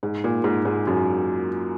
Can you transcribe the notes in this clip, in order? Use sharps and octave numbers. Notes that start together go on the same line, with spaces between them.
G#2
A#2
G#2
G#2
F#2